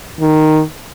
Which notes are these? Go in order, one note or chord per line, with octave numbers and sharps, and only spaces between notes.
D#3